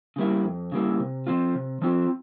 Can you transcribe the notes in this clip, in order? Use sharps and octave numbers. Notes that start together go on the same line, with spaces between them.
C#3 G3 A#3 E4
F2
C#3 G3 A#3 E4
C3
F3 C4 F4
C3
F3 C4 F4